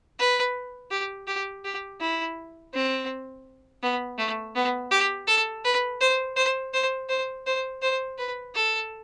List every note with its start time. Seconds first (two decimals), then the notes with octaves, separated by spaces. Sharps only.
0.19 B4
0.91 G4
1.27 G4
1.65 G4
2.01 E4
2.74 C4
3.83 B3
4.18 A3
4.56 B3
4.91 G4
5.28 A4
5.64 B4
6.01 C5
6.36 C5
6.74 C5
7.09 C5
7.46 C5
7.82 C5
8.18 B4
8.55 A4